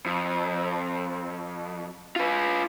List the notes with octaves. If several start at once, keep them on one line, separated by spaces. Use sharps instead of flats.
F2
F4 B4